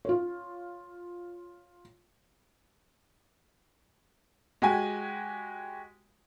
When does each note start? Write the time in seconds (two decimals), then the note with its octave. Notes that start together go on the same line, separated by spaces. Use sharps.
0.05 F4 C#5
4.62 G#3 F#4 G4 F#5 G#5